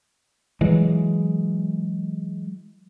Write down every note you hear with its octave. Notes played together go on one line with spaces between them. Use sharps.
E3 F#3 G#3